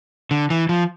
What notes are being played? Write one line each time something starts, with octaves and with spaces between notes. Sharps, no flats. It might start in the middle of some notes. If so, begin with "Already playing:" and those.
D3
E3
F3